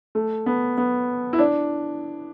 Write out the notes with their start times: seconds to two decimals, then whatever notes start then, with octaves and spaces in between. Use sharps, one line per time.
0.15 A3
0.46 B3
0.78 B3
1.33 E4
1.39 D4